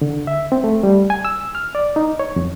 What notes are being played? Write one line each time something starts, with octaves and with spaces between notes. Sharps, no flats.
D3
E5
C4
A3
G3
G#5
E6
F6
D5
D#4
C#5
F2